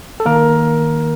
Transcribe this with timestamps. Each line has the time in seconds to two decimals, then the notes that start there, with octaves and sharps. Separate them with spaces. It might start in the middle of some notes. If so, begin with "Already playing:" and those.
0.20 A4
0.26 D#3 A#3 A#4